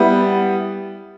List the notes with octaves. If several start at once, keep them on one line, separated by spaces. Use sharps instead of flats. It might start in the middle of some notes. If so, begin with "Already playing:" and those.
Already playing: G3 B3 E4